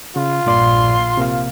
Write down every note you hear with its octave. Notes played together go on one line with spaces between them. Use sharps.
C#3 F4
A#1 G2 A#2 D5 C6
C3 A#3 F5